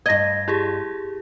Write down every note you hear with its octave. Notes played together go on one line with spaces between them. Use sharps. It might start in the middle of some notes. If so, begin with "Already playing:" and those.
G2 D#5 G#6 A#6
E4 G4 G#4